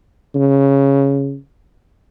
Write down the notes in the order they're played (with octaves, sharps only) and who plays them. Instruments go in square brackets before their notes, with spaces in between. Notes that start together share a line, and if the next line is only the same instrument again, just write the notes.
[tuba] C#3